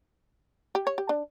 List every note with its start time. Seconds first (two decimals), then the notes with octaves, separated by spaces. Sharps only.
0.75 G4
0.87 C#5
0.98 G4
1.09 D4